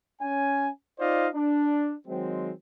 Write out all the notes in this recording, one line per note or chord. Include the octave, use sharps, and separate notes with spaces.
C#4 G#5
D#4 F4 C5 D5 D#5 F5
D4
D#3 F#3 G#3 C4